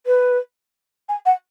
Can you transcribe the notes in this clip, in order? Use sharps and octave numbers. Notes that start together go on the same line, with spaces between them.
B4
G#5
F#5